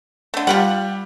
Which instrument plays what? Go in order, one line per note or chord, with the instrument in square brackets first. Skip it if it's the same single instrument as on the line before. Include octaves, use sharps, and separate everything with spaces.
[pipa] D3 A3
[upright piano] G3 [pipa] F4 G4 F#5